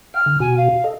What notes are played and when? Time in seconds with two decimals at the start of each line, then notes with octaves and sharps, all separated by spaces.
0.14 F5 G5 F6
0.26 D3
0.40 B2 F#4 G#5
0.57 F5
0.84 A4 D#5